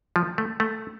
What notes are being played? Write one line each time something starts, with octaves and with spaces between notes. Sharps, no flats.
F3
A3
A3